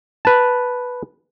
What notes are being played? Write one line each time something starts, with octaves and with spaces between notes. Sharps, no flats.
B4 A5